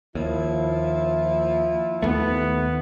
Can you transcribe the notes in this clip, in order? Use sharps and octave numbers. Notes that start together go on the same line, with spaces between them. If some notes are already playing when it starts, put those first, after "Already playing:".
D#2 F3 E4
D#2 A3 B3